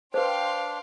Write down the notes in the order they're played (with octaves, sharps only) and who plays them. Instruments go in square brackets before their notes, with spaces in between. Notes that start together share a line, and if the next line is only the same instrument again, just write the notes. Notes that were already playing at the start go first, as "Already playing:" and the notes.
[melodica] D4 [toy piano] B4 C5 [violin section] F5 G5 C6